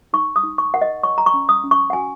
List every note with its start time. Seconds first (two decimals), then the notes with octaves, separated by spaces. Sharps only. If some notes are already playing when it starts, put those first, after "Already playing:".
0.13 D#4 C#6
0.36 D#6
0.43 D#4
0.58 C#6
0.74 A#4 F#5
0.82 D#5
1.03 C#5 C#6
1.18 A#5
1.26 C#6
1.34 C#4
1.49 D#6
1.64 C#4
1.71 C#6
1.90 F#5
1.93 F#4 G#5